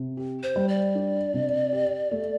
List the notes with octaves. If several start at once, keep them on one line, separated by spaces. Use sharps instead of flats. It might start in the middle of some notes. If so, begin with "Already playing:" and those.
Already playing: C3
G4
C5
G3
D5
D4
C3
G4
A3